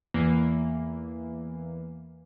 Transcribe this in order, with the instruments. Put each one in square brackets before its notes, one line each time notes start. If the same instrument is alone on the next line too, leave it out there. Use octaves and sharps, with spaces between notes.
[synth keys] E2 E3 A#3